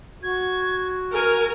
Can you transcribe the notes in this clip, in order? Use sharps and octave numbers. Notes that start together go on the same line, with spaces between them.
F#4 G#6
A#4 G#5